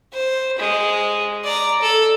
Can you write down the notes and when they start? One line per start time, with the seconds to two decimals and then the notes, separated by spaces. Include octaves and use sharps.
0.13 C5
0.58 G#3
1.44 D5 A#5
1.82 A4